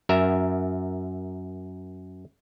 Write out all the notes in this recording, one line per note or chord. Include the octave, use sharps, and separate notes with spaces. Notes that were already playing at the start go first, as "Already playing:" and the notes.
F#2 A#4 E5